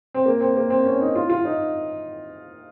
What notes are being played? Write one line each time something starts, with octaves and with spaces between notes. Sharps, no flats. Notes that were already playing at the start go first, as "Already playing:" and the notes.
C4
A#3
C4
A#3
C4
C#4
D#4
F4
F4
D#4